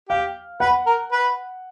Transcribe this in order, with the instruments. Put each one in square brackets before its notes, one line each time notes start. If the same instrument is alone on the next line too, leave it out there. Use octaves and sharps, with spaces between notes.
[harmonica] G4 [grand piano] F5
[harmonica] B4 [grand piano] F#5
[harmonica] A#4
B4